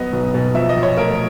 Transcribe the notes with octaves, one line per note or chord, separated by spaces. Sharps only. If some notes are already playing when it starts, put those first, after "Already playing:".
Already playing: F#3 B3 D#5
B1
B2
F3 E5
D#5
A#1
C#5
A3 A#4